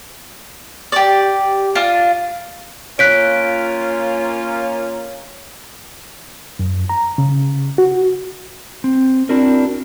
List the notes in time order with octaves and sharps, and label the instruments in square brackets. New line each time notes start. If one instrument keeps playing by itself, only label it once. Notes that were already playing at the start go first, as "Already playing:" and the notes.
[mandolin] G4 D5
D4 F4
[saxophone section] A#3 C#4 F4 [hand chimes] C#5 [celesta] F#6 B6 D7
[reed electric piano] F#2
A#5
C#3
F#4
[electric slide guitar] C4
C4 D4 E4 F#4 A#4